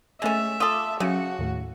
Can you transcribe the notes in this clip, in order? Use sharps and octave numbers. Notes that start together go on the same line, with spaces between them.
G#3 A3 C#4 E5 A6
F4 A4 D6 D#6
C#3 F#3 C#4 F#4 C#7
D#2 A2